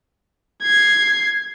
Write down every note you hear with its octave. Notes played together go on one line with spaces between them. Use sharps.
G#6 C7